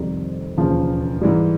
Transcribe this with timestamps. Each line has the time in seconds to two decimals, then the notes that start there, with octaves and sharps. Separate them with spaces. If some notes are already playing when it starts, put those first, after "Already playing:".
Already playing: F2 C3 D#3 G3
0.57 E1 D#2 C#3 F3
1.21 G#2 E3 G3